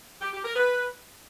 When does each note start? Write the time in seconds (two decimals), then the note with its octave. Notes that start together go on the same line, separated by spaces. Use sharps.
0.22 G4
0.33 G4
0.44 A#4
0.56 B4